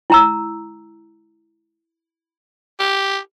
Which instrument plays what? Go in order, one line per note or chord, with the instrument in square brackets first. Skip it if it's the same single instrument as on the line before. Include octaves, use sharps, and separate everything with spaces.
[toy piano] E4 A#5 E6
[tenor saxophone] G4